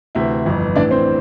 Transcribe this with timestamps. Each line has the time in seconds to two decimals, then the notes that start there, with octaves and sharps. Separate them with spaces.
0.15 D2 C3 E3 E4 E5
0.46 G1 F2 E3
0.75 A1 A2 E3 D4 D5
0.91 C4 C5